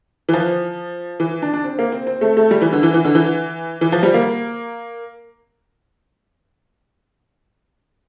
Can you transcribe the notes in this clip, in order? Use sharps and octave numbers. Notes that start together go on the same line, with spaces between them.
E3
F3
E3
D4
D4
C4
A#3
C4
C4
A3
A3
G3
E3
D3
E3
E3
D3
E3
E3
F3
G3
A#3